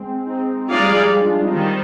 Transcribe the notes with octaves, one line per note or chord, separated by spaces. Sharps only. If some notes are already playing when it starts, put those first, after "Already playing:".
Already playing: G#3 C4
C4 D#4
G#3 D4 D#4 F4 G#4 D5 F5
G3
F3
G3
F3 G#3
D4 F4
D4 F4
C4 D#4
D#3 G3